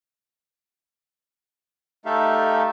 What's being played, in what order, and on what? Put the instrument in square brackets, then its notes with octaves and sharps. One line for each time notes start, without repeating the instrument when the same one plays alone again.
[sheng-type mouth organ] A3 D#4 G4 A4 E5 F5